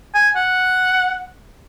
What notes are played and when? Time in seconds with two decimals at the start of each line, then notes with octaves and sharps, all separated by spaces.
0.15 G#5
0.36 F#5